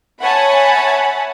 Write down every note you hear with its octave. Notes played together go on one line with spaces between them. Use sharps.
C#5 E5 F#5 G#5 A5 B5